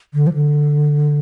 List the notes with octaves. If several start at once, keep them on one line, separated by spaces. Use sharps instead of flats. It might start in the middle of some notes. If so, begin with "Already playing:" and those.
D3
F3
D3